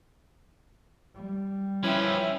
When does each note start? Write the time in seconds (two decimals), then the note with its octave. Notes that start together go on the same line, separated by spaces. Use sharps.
1.14 G3
1.83 F3 C#4 E4 B4 E5 G5